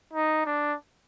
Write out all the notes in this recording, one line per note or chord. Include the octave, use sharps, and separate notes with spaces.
D#4
D4